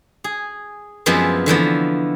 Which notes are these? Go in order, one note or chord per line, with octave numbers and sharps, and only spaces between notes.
G#4
F#2 F3 G#3 B3 C4
D3 E3 F3 B3